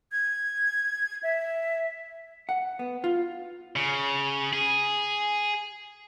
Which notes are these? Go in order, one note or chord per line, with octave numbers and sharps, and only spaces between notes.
G#6
E5
F#5
B3
F4
C#3
G#4